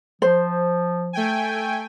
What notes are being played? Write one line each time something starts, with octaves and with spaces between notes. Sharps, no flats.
F3 C5
A3 G5 G#5